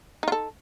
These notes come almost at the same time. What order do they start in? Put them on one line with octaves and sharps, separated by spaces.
D#4 F4 A4